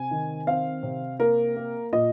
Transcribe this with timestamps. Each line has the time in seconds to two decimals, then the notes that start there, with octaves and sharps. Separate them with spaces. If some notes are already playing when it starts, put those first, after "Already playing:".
Already playing: C3 G#5
0.11 D#3
0.47 C4 F5
0.83 C3
1.19 A#3 A#4
1.56 A#3
1.93 A#2 D#5